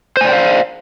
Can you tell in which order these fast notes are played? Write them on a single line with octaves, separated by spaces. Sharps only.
C5 G#5 D5 G5 F5